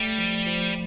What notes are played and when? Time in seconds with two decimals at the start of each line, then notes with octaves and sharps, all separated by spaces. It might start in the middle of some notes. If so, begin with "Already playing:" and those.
Already playing: G3 A3
0.18 F3
0.46 F3